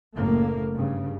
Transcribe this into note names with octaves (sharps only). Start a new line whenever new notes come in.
F#1 A2 A3 A#3
G2 C#3